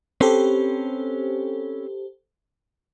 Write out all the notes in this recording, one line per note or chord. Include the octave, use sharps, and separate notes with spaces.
C4 C#4 G4 A4 B4 C5